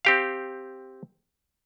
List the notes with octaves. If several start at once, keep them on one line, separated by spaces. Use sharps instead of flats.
C4 G4 F5